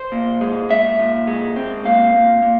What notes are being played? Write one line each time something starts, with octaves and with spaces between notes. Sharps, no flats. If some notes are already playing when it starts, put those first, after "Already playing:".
Already playing: C5
A#2
G#3
A#2 E5
A#2
G#3
C4
A#2 F5
A#2
A#2